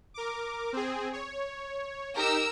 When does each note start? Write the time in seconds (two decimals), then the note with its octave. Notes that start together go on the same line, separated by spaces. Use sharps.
0.14 A#4 D6
0.73 C4 G#4
1.13 C#5
2.16 D#4 G4 A#4 E6